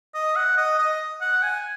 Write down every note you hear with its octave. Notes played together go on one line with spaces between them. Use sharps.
D#5
F#5
D#5
D#5
F#5
G#5